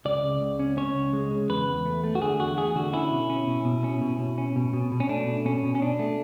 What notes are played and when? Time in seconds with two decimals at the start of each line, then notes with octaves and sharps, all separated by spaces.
0.05 C#2 D5
0.23 C#3
0.42 C#2
0.59 C#4
0.77 C#4 C#5
0.95 C#2
1.13 G#3
1.31 C#3
1.49 E2 B4
1.68 E2
1.85 A3
2.04 A3
2.15 F#4
2.21 D3 G#4
2.39 E2 F#4
2.57 A3 G#4
2.75 D3 F#4
2.93 C#4 E4
3.11 B2
3.30 C#4
3.47 B2
3.65 B2
3.84 C#4
4.01 B2
4.19 B2
4.38 C#4
4.56 B2
4.73 B2
4.92 B2
5.00 C#4
5.09 A3 D4
5.27 B2
5.45 B2 C#4
5.63 B2
5.75 C#4
5.81 B2 D4
5.99 A3